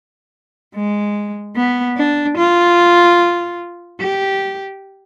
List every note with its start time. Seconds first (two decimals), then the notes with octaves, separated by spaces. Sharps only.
0.75 G#3
1.56 B3
1.97 D4
2.38 F4
4.01 G4